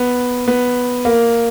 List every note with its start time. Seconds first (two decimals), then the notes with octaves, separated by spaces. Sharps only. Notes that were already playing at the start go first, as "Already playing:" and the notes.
Already playing: B3
0.48 B3
1.05 A#3